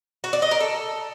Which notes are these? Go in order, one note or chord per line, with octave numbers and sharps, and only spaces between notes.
F#4
D5
D#5
A#4
A4